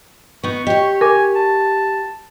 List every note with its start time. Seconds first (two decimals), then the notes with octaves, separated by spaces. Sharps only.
0.44 B3 D#4 C#6
0.67 G4 C#5 D#5
1.01 A#4 G#5 D6
1.36 A5